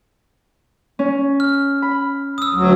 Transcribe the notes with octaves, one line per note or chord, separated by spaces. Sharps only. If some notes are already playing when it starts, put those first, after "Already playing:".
C#4
F6
B5
D#6 E6
D2 F#3